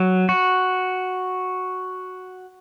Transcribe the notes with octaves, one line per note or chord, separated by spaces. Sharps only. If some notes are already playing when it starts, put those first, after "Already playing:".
Already playing: F#3
F#4